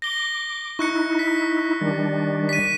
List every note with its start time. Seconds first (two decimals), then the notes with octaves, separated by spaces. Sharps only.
0.02 D6 A#6 G7
0.79 D#4 E4 C#6 F#6 C#7
1.19 B6
1.81 D#3 G3 D4
2.49 B6 D#7